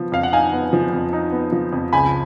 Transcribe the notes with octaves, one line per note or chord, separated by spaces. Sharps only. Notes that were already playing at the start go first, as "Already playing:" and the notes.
Already playing: F3 B3
F2 F5
F#5
D#4 F5 G#5
B3
F3
F2
D#4
B3
F3
F2
C#2 G#5 B5